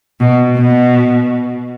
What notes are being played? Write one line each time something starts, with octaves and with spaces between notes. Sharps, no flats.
B2
B2